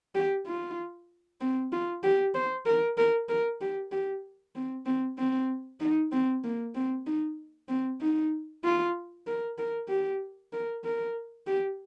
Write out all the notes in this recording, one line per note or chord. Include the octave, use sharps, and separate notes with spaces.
G4
F4
C4
F4
G4
C5
A#4
A#4
A#4
G4
G4
C4
C4
C4
D#4
C4
A#3
C4
D#4
C4
D#4
F4
A#4
A#4
G4
A#4
A#4
G4